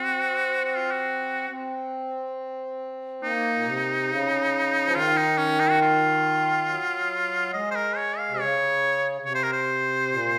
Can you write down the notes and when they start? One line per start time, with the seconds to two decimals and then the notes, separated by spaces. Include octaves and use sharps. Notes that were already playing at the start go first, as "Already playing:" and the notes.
Already playing: C4 F#4
0.64 F#4
0.77 F4
0.92 F#4
1.50 C4
3.23 A#3 D#4
3.54 A#2
3.65 C3
4.10 C#3
4.85 F3
4.95 D#3 F4
5.17 D#4
5.38 C#4
5.60 D#4
5.70 F#4
5.81 F4
6.67 F#3
7.53 G#3 D#5
7.71 C5
7.75 A#4
7.96 C#5
8.18 F5
8.29 C3
8.39 C#3 C#5
9.21 C#3
9.25 C3 C#5
9.35 C5
9.43 A#4
9.53 C5
10.12 A#2